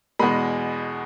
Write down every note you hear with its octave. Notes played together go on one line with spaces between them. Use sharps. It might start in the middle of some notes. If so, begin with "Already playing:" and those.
E2 B2 G#3 B5